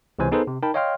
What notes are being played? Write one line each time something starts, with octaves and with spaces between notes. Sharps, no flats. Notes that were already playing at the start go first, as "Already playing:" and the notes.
C#2 C3 E3 C5 G#5
B3 D#4 G#4 A4 B4 C5
C3
D#4 A#4 G5 A5 B5
C#5 D#5 F5 G5 C6 F6